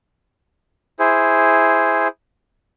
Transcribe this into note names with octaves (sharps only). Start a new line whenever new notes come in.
E4 G#4 C5